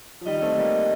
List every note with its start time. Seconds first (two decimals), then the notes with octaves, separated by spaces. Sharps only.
0.21 F3
0.26 D#3 G3 D#5
0.42 A3 C4
0.58 G3 A#3